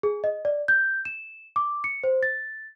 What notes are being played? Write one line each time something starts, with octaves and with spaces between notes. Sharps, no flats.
G#4
D#5
D5
G6
E7
D6
C#7
C5
A6